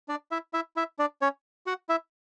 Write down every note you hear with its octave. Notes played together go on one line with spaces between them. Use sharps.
D4 D5
E4 E5
E4 E5
E4 E5
D4 D5
C#4 C#5
F#4 F#5
E4 E5